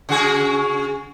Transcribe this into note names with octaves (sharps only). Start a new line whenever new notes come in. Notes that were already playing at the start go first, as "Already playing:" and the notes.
C#3 F#4 G#4